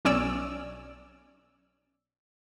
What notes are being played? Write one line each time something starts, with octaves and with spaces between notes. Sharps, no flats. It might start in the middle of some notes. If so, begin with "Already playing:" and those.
B1 C#4 D5 E6